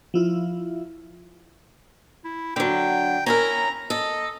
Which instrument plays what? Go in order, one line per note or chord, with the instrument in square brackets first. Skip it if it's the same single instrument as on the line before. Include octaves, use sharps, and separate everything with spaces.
[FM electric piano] F3 E4 F4
[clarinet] E4
[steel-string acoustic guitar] D3 F#3 [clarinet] G5
[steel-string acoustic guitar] C#4 E4 A#4 [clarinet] A#5
[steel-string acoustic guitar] A4 [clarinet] D#5